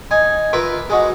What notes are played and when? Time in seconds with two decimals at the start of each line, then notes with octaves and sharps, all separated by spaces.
0.11 D#4 G#5
0.53 F4 A#4 B4 E5 D6
0.90 G#3 D#4 F#4